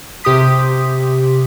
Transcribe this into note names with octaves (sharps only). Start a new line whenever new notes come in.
C3 G4 C6 D#6 B6